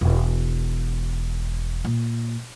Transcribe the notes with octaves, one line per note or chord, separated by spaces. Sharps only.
E1
A#2